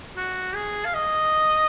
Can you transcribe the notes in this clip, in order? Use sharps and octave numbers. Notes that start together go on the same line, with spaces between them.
F#4
G#4
F5
D#5